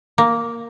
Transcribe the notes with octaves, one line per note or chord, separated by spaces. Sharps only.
A#3